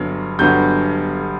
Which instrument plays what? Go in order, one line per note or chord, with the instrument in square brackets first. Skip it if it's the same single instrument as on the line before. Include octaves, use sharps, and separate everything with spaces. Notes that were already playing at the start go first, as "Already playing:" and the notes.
Already playing: [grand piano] G1 G2 F#3 B3
G1 G2 F#3 B3 G6